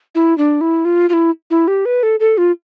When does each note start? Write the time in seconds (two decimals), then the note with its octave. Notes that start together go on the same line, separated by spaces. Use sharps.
0.15 E4
0.38 D4
0.61 E4
0.85 F4
1.09 F4
1.13 E4
1.50 E4
1.67 G4
1.85 B4
2.03 A4
2.20 A4
2.38 F4